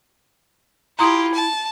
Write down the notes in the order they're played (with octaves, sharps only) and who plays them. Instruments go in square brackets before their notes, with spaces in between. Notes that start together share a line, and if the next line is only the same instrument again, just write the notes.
[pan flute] E4 [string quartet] F4 G4 [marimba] A#5 C6 D#6
[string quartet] A5